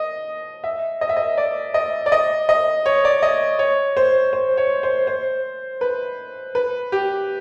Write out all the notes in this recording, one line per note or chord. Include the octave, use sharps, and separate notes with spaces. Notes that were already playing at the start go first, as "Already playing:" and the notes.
Already playing: D#5
E5
D#5
E5
D#5
D5
D#5
D5
D#5
D#5
C#5
D5
D#5
C#5
C5
C5
C#5
C5
C5
B4
B4
G4